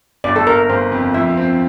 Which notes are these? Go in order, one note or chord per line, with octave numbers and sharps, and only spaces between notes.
G1 D5
A4
G1 A#4
G1 C5
F2
F3 E5
C4